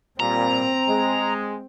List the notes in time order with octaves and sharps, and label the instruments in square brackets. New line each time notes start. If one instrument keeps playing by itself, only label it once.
[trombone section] A#2 G3 [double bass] C4 [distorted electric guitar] A#5
[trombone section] G#3